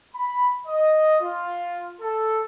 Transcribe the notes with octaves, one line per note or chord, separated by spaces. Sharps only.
B5
D#5
F4
A4